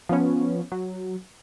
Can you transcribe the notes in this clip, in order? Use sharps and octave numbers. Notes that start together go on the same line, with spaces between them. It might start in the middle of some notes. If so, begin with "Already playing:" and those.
F3 B3 C#4
F#3